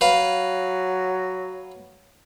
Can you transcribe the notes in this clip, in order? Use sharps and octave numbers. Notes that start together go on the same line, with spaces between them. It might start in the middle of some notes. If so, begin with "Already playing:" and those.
F#3 B4 F5